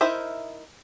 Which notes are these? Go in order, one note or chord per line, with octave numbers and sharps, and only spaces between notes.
D#4 E4 A#4 C5 E5